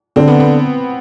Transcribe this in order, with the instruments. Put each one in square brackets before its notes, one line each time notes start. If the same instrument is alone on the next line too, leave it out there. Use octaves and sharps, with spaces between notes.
[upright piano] D3 [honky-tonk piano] C4
[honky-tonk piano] B3
B3